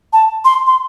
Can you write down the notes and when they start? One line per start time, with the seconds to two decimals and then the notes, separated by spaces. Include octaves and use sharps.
0.13 A5
0.45 C6
0.67 C6